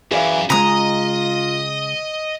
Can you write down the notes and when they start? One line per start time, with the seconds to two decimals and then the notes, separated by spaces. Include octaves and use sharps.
0.11 F#2 E3 G#4 D5 F5
0.50 C#3 G#3 F4 D#5 A#5 D#6